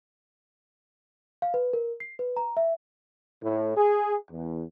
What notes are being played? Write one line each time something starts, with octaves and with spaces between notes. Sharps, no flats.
F5
B4
A#4
C7
B4
A#5
E5
A2
G#4
E2